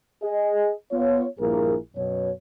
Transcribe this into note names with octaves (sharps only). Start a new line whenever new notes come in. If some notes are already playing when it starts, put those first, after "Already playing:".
G#4 D#5
B3 F4 C#5
A#1 G2 A#3 E4 G#4 A#4
F#2 B2 C#5